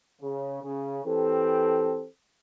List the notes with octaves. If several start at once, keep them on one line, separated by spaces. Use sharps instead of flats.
C#3
C#3
E3 C4 G4 A4